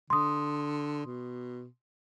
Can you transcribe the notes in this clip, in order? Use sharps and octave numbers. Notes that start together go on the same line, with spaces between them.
D3 C6 D#6
B2